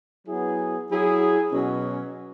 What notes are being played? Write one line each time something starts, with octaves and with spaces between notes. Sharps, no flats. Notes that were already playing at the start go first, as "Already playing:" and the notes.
F#3 B3 E4 G#4
F#3 E4 G#4
B2 F#3 C#4